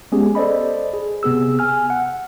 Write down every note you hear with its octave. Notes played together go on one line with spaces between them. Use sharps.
G#3 B3 C#4 G4 G#4
A4 C5 D5 D#5 B5
G#4
C3 B3 G#4 E6
G#5 F6
F#5